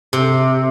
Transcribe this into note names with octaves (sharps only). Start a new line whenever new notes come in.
C3